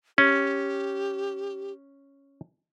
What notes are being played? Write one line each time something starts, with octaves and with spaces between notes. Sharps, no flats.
C#4 G4